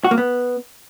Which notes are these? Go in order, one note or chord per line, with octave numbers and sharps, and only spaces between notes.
F#4
A#3
B3